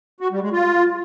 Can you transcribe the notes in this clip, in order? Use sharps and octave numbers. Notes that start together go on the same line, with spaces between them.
F#4
G3
G#3
F4